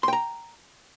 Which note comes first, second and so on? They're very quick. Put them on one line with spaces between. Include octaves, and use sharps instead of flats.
C6 G5 A#5